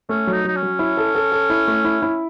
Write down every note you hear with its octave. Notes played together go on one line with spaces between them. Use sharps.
A3 C#4
F#3
D#4
F#3 D#4
C#4
F#3
E4
A4
A4
A4
E4
A3
E4
E4